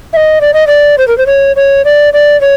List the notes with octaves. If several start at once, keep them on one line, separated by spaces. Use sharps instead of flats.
E5
D#5
D5
D#5
D5
C5
A#4
C5
C#5
C#5
D5
D5
C#5